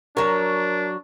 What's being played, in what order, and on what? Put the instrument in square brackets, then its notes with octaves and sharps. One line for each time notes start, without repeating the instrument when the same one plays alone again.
[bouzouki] F#3 C#5 [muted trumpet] D4 [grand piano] A#4